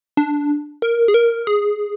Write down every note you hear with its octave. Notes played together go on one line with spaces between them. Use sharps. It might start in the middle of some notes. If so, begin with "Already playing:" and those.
D4
A#4
G#4
A#4
G#4